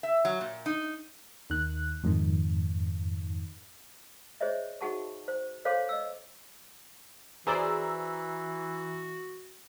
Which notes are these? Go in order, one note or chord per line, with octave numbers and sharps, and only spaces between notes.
E5
F#3
A#2
D#4
D#2 D#3 F#6
F2 G#2 D#3
G#4 C5 C#5 D#5 E5
D#4 F#4 G#4 F#5 A5 C#6
C5
A4 C5 C#5 F5 C6 D6
D#5 E6
E3 F#4 G#4 C5 D5 A#5 E6